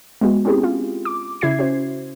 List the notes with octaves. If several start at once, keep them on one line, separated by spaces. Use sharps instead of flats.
G#3 B3 F#4
C4 C#4 E4 G4 G#4
F4
D6
C#3 E4 E5 G#6 C7
C#4 F#4 C5